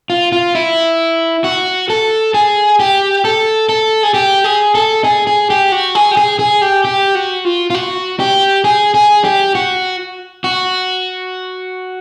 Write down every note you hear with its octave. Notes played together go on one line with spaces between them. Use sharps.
F4
F4
E4
F#4
A4
G#4
G4
A4
A4
G#4
G4
G#4
A4
G#4
G#4
G4
F#4
G#4
G4
G#4
G#4
G4
G4
F#4
F4
F4
F#4
G4
G#4
G#4
G4
F#4
F#4